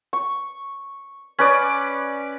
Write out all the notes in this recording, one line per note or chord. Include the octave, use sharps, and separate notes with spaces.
C#6
C#4 B4 D5